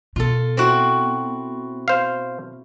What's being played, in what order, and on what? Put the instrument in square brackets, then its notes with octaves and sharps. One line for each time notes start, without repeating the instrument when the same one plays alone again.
[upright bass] B2 [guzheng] F4 A4
[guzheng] C4 E4 F#4
[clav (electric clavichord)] C5 F5